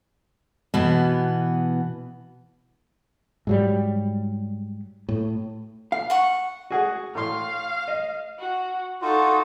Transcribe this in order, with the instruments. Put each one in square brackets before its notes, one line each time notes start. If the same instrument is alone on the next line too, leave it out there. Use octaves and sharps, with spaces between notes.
[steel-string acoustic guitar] B2 E3 B3
[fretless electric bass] G#2 F#3 G3
A2
[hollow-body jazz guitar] F5
[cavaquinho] F#5 C#6
[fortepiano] F#4 G#4 F#5
[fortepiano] A2 C6 [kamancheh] F5
[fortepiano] D#5
[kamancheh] F#4
[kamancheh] D#4 A4 [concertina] F4 F#4